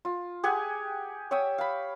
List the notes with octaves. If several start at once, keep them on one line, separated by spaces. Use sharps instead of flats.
F4
G4 G#4 F#5 G#5
C#5 E5 G5 D#6
F5 B5